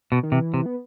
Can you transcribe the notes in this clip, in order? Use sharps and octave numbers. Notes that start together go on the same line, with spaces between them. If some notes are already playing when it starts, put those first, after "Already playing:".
B2
D#3
C3 E3
C3
B3